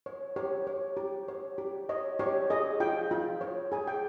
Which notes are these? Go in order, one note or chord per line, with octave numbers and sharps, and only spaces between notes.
C#5
G4 C#5
C#5
G4
C#5
G4
C#5 D#5
G4 C#5
G#4 D#5
F4 G5
F4
C#5
G#4 G#5
G5